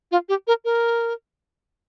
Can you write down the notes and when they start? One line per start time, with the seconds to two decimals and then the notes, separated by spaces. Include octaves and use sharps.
0.11 F4
0.29 G4
0.47 A#4
0.65 A#4